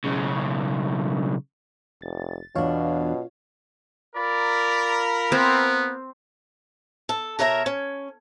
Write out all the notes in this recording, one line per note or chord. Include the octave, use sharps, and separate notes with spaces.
B1 C#3
F1 A6
E2 B2 D4 F4 C#5 F5
F4 A#4 D5 B5
B3 C4
A4
B2 A#4 C#5 E5 A#5
C#4